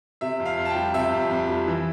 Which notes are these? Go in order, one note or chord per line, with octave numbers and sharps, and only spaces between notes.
C3 E5
F2
F5
F2
A5
G5
G3
C3 E5
F2
F2
G3
E3